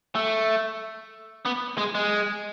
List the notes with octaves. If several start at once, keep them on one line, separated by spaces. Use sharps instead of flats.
A3
B3
G#3
G#3